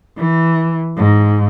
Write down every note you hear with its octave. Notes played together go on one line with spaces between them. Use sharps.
E3
G#2